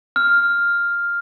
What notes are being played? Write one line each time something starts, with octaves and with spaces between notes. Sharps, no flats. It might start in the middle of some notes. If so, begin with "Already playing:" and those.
F6